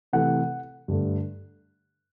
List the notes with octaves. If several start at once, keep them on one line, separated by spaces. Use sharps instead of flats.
C3 E3 A3 F#5
G2 D3 A3